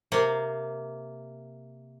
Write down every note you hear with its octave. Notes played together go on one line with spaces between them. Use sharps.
C3 A#3